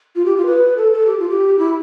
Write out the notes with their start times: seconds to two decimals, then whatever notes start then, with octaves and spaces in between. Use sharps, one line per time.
0.16 F4
0.26 G4
0.37 F4
0.46 B4
0.77 A4
0.93 A4
1.07 G4
1.19 F4
1.29 G4
1.59 E4